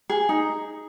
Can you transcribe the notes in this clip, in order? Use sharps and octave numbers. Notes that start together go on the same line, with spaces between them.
G#4
D#4